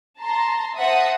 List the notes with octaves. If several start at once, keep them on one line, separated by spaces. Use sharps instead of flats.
A5 A#5 C6
C5 E5 F#5 A5 D#6 A#6